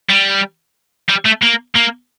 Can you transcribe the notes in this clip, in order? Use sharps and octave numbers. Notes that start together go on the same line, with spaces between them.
G3
G3
A3
A#3
A#3